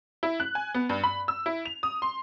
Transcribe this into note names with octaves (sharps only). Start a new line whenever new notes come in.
E4
F#6
G#5
B3
G2
B5
E6
E4
F7
D#6
C6